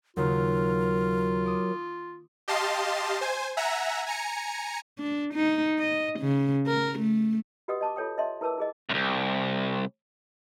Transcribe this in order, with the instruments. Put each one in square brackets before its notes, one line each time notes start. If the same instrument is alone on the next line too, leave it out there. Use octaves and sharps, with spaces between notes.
[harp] D#2 C#3 [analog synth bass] F#3 [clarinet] F4 [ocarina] A#4
[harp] C6 D6 D#6
[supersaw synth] G4 D#5 F5 A5 C6
C5 G#5
E5 F#5 G#5 A#5
G#5 A#5 C#7
[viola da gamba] D4
D#4
D#5
C#3
A#4
A3
[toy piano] F#4 G4 B4 D#5 F#5 D#6
D#5 A5 C#6 D6
F4 A4 C#5 G5 D#6
D#5 E5 A5 C6
E4 A#4 B4 A5 D6 E6
E4 G#4 D#5
[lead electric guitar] C2 F#2